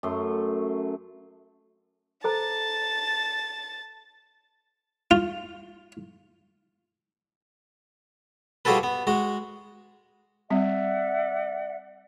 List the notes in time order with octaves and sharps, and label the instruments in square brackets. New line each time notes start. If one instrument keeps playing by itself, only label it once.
[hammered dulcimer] F#2 A3 C6
[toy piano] A4 C5 A#5 [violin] A5 A6
[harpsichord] F4
F3 G3 F#4 G#4 A4 B4
B3
G#3 F#4
[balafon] G3 C4 [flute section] D5 E5 F#5